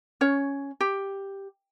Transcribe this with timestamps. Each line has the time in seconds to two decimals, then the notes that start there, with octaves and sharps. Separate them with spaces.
0.21 C#4 C#5
0.81 G4